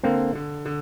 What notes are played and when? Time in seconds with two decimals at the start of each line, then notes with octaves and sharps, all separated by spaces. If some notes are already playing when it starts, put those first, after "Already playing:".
0.03 D3 A#3 C4
0.35 D3
0.66 D3